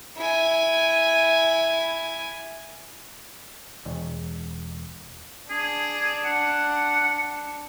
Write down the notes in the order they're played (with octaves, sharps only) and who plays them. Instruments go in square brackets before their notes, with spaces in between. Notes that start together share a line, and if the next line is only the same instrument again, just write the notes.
[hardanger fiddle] E4 G#5
[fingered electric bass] E1
[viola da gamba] D4 [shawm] G#4
[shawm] F#5